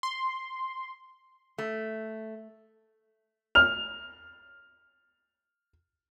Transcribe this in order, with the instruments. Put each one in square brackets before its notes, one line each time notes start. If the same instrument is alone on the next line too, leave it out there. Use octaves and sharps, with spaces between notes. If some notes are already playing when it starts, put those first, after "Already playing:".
[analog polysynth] C6
[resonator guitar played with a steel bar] A3
[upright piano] F6 F7